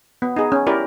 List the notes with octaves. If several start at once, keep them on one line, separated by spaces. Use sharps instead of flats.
B3
D#4 G#4
C#4
E4 G4 A#4 D5